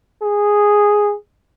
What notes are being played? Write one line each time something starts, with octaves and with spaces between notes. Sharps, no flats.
G#4